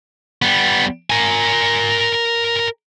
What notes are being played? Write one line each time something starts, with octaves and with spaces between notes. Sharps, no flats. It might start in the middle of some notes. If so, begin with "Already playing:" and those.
G3 B3
A#4 G#5